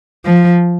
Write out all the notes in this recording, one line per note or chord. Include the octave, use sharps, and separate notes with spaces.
F3